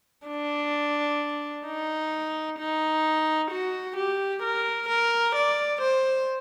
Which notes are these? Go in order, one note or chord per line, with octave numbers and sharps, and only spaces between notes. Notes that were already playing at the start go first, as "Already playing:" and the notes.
D4
D#4
D#4
F#4
G4
A#4
A#4
D5
C5